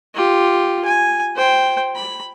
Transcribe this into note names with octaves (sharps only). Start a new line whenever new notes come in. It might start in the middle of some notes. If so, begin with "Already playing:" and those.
F4 G4
G#5
C5 G5
B5